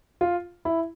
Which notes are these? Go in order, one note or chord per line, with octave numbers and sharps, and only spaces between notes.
F4
E4